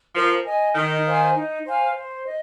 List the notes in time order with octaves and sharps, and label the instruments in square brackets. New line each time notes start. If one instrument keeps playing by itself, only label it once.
[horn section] F3 [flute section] A#4
[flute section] D#5 G#5
[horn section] D#3 [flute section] D#4
[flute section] C5 F5 G#5
D#4
C5 F5 G#5
C5
D#5